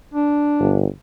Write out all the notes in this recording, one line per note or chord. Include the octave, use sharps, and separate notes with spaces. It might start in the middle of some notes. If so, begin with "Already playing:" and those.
D4
G1